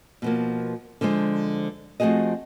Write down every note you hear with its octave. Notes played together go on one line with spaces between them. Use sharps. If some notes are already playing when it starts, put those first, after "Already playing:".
B2 F3 A#3
D3 F3 G#3 C5
F3 A3 C4 F#4 G#4 D#5